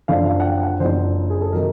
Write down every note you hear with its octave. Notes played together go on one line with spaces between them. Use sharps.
F#1 F2 D3 F5
F5
F#5
G5
F#5
F#1 F2 D3 C5
G#4
A4
C3 D#3 F#3 A#4